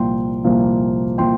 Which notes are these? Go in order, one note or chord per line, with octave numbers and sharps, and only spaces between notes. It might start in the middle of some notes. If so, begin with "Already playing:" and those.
Already playing: C2 A#2 F3 A#3 G5 C6
C2 A#2 F3 A#3
A#2 F3 A#3 G5 C6